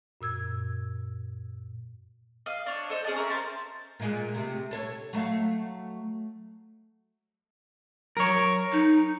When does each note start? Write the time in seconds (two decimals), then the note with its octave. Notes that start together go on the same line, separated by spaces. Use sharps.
0.21 F#2 A#2 E6 G#6
2.46 D#5 F5
2.66 D4 C#5
2.90 A4 C5 D#5
3.05 C#4 G#4 D#5 A5
3.16 C#4 A#4 E5
3.30 C5 A5
4.00 A#2 G#3
4.35 C3 A3
4.71 A4 C5 C#5
5.13 F#3 A3 F5
8.17 F#3 A#4 C#5
8.72 D#4